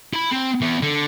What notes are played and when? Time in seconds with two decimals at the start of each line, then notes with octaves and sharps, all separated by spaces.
0.14 E4 B5
0.32 C4
0.62 E2
0.82 D3